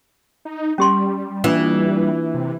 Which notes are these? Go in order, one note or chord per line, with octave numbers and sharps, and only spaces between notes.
D#4
G3 C#4 G4 C6
E3 A#3 D4 F4
C3